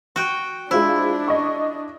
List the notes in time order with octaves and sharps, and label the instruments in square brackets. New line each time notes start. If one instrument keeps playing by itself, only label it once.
[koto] F#4 G5
[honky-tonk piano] G#3 F4 C5 [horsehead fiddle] D4 [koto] E4
[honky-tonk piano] D#5 C#6